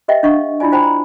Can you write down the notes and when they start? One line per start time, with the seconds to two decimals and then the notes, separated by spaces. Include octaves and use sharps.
0.08 G4 B4 D#5 E5 G5
0.23 D4 D#5 F5 F#5 C#6
0.60 D4 E4 F4 D5 G#5
0.72 F4 C5 G5 G#5 A#5 B5
0.83 A#5